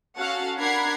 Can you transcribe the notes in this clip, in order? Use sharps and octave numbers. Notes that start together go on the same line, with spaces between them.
C#4 F#4 A4 F5 F#5
D4 A#4 F#5 B5 G#6 C7